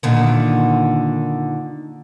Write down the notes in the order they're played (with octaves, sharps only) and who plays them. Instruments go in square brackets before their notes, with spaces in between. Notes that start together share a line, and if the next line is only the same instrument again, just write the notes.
[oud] A#2 D3 D#3